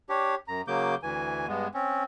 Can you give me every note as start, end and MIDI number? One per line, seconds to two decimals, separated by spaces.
0.09 0.35 62
0.09 0.35 67
0.09 0.35 73
0.48 0.61 42
0.48 0.61 82
0.68 0.95 49
0.68 0.95 54
0.68 0.95 58
0.68 0.95 86
0.68 0.95 91
1.03 1.47 38
1.03 1.47 52
1.03 1.47 80
1.48 1.68 43
1.48 1.68 56
1.48 1.68 59
1.74 2.03 60
1.74 2.03 61